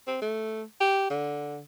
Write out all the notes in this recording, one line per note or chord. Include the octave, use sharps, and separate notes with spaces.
C4
A3
G4
D3